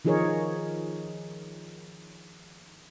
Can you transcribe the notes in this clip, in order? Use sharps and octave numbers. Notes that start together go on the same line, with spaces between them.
D#3 F3 D#4 G#4 A#4 C#5